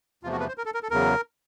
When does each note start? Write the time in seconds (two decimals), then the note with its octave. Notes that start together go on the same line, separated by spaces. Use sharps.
0.23 E2 C3 F3 A3 F4
0.32 F#4
0.40 B4
0.48 C5
0.58 A#4
0.66 A4
0.74 A#4
0.83 A4
0.91 E2 C#3 F#3 A#4